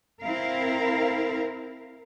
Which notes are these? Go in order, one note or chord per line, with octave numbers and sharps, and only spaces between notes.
C4 E4 A#4 F5